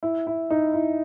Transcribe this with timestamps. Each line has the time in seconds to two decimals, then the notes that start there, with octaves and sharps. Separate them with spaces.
0.03 E4
0.27 E4
0.51 D#4
0.74 E4